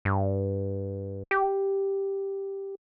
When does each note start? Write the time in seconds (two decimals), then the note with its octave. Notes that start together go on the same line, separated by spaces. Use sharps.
0.05 G2
1.31 G4